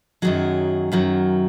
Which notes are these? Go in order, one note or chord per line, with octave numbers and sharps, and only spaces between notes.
F#2 D#3 F#3 G#4
F#2 D#3 F#3